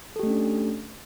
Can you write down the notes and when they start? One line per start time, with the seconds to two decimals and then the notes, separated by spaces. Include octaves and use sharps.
0.16 A4
0.19 G4
0.23 A3
0.27 C#4
0.30 D4